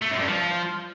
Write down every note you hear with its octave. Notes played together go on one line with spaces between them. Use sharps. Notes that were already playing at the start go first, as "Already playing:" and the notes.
A3
F#2
G2
F3